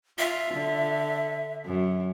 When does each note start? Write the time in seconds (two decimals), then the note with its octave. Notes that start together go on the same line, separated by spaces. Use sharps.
0.19 F4 E5
0.54 D3
1.66 F#2